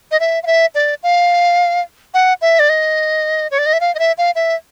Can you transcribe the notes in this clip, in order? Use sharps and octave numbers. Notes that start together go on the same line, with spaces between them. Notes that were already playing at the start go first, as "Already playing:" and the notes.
D#5
E5
F5
E5
D5
F5
F#5
E5
D5
D#5
C#5
D5
D#5
E5
F5
D#5
E5
F5
E5